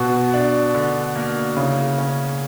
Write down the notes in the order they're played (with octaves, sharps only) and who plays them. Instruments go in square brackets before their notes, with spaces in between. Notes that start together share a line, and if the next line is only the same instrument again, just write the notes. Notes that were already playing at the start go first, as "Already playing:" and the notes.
Already playing: [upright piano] B2 [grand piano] F#4
[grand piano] D4
D3
A#3
[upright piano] C#3 [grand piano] E4
[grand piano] C#4